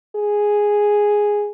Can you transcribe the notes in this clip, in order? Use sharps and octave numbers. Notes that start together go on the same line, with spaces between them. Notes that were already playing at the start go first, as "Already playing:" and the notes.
G#4